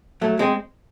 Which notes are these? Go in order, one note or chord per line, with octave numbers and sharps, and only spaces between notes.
F#3 A3
G#3 C4